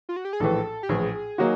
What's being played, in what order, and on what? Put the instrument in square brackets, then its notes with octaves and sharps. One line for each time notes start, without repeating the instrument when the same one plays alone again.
[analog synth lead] F4
F#4
G4
G#4
[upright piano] A#1 A2 E3 [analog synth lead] A4
[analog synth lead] G4
[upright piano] A#1 A2 E3 [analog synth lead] G#4
[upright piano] F#3 A#3 D#4 F#4